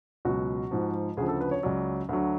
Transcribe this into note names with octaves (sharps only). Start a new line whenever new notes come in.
C#2 B2 F#3 F#4
G#2 F3
D2 C#3 F3 G#4
A4
B4
C#5
C#2 C#3 F#3 D5
D2 D3 F#3